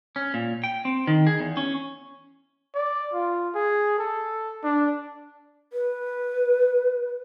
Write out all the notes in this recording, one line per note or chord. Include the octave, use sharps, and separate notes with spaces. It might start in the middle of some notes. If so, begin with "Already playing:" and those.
C#4
A#2
G5
C4
D#3
G#4
E2
C#4
D5
F4
G#4
A4
D4
B4